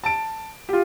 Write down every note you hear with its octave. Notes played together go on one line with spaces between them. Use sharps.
A5 D7
F4 G4